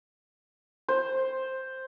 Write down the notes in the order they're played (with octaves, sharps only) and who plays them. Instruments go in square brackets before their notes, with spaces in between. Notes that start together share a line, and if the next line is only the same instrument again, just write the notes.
[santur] C5